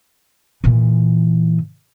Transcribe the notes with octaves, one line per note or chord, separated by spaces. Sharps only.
A#2 E3